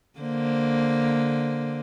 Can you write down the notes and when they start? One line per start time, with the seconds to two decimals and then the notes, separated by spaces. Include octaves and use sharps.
0.19 D3 A#3 C5